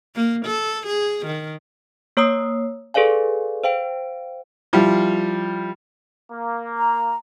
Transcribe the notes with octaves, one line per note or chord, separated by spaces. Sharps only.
A#3
A4
G#4
D#3
A#3 C#5 A#5 D#6 E6 C7
G#4 A4 B4 D5 F5 G#5
C5 F5 G5 D7
F3 G3 E4 F4 G4
A#3
A#5